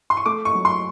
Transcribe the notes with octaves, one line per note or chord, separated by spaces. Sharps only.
C6
C#6
A3 D6
C#6
F#3
C6